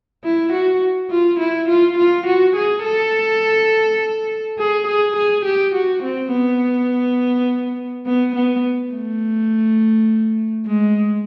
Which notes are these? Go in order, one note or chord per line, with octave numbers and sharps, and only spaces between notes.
E4
F#4
F4
E4
F4
F4
F#4
G#4
A4
G#4
G#4
G#4
G4
F#4
C4
B3
B3
B3
A3
G#3